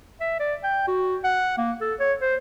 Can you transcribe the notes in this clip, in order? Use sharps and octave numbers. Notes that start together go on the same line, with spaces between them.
E5
D5
G5
F#4
F#5
A#3
A4
C#5
C5